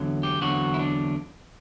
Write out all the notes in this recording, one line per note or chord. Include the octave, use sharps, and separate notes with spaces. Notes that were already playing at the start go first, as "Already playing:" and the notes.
Already playing: E2 D3 F#3
G4
E2 D3 F#3 F#4
E4
D4